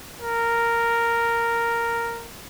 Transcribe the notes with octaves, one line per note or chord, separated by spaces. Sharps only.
A#4